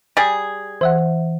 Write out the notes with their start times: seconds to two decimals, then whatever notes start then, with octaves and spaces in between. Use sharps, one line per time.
0.17 G3 G#4
0.81 E3 C5 E5 F#5